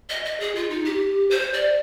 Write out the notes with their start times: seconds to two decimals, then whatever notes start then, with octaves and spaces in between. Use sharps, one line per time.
0.09 D#5
0.25 D#5
0.40 G#4
0.55 F4
0.70 D#4
0.85 G4
1.31 C5
1.53 D5